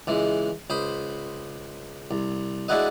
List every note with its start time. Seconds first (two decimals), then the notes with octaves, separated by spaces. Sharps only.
0.07 C#2 E3 G#3
0.70 C#2 C5 B5 D#6
2.11 C2
2.68 G#3 D4 E4 F#4 B4 D#5